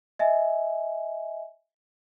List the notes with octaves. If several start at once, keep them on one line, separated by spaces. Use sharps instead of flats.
D#5 E5 G#5